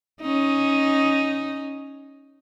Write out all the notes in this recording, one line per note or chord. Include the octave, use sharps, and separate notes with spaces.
C#4 D#4